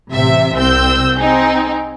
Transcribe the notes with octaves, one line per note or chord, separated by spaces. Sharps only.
A1 C3 E5
C2 C4 E6 G6
C4 D#4 G#4